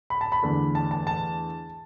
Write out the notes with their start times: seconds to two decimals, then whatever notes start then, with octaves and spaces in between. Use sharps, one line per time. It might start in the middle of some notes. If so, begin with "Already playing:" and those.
0.10 B5
0.21 A5
0.32 B5
0.42 E2 D3 A3
0.75 A5
0.91 A5
1.07 A5